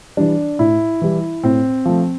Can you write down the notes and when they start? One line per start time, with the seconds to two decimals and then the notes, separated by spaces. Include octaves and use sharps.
0.17 E3 G3 D4
0.59 A2 E4
1.02 E3 G3
1.43 A2 C4
1.85 F3 A3